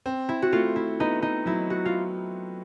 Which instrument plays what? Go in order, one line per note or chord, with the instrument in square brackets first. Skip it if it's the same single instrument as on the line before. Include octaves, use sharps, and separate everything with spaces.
[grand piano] C4
[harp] E4
F#4
[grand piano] A3 [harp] F4
[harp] E4
[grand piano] B3 [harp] D#4
[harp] D#4
[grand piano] F#3 [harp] E4
[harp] F#4
F4